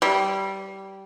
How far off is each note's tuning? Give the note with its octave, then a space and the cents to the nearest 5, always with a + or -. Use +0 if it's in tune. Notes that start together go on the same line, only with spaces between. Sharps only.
G3 -15